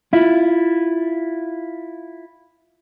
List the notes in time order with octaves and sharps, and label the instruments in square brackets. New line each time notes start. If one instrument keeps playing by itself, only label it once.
[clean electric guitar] E4 F4